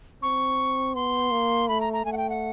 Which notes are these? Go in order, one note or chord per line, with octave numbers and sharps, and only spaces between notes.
C4 C#6
B3 C6
A#3
A3 B5
A#5
A#5
A3 G#5
F#5
G5
F#5